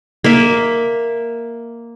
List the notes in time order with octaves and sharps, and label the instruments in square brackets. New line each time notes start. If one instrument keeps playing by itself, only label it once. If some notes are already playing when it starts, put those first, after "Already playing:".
[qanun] A#3 E5